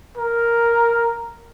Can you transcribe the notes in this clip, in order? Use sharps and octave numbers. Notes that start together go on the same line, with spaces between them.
A#4